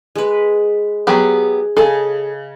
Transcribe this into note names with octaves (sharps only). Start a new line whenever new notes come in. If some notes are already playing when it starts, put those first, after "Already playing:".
G#3 B4
F#3 B3 G4 G#4
C#3 G#4 A4 D#5